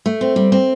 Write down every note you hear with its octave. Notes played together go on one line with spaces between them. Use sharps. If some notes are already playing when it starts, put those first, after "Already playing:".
A3
C4
G3
C4